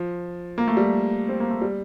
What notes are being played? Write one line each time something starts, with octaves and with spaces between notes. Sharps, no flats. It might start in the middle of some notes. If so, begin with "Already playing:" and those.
Already playing: F3
A#3
A3
G3
C4
A#3
A3
G3